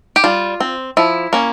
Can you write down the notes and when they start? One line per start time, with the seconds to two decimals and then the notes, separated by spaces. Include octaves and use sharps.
0.16 G4
0.24 G3 F4
0.60 C4
0.97 F3 E4
1.33 A#3 C#4